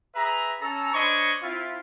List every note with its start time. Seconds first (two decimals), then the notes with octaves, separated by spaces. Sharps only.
0.15 G#4 B4 E5 A#5
0.60 C#4 A4 A#5
0.93 D4 C5 C#5 D#5 B5 C#6
1.42 C4 E4 F4